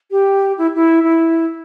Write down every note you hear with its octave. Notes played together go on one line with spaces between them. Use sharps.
G4
E4
E4
E4